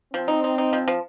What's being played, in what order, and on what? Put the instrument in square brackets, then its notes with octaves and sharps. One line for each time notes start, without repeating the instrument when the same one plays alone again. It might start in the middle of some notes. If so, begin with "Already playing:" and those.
[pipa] F3 [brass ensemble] C4
[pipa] D#4
D#4
D#4
F3
F3